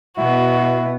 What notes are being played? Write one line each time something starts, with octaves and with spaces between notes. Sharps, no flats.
B2 B3 E4 F#4